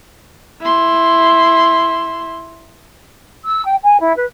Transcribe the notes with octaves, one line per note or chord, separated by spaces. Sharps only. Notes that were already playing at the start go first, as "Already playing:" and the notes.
E4 C6
E6
G5
G#5
E4
B4